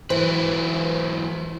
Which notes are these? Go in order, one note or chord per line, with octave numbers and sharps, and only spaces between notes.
E3 F#3 E4 B4 C5